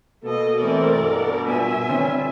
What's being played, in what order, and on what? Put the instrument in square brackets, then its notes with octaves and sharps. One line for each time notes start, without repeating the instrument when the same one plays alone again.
[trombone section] B2 [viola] A#3 D#5 [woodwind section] A4
[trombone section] E3 A3 C4 [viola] A#4 D5
[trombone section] G2 B2
[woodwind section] A#2 [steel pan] B3 [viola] E5 G#5
[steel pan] D3 C4 C#4 [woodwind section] E3 G3 F4